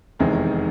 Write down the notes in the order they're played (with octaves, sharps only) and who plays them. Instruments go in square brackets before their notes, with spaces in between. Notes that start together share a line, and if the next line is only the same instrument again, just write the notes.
[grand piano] F1 E2 C3 D#3 G#3